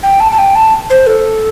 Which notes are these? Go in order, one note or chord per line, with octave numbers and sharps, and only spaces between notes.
G5
A5
A5
G5
A5
C5
A4